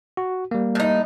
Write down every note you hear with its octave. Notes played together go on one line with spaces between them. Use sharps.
F#4
G3 A#3
A2 D#4